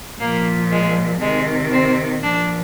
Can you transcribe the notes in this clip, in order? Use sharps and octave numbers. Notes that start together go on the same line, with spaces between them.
A#2 F3 A#3
G#3
C3 D#3 G#3
C4
A#2 F3 D4